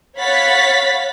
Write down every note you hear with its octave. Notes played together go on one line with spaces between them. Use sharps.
C#5 F5 F#5 B5 A6 B6